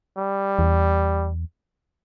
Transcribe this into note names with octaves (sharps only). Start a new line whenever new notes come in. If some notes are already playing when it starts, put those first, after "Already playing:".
G3
E2